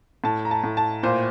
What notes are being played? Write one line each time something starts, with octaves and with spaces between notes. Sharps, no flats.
A2 A5
A#5
A5
A2
A5
A#2 C5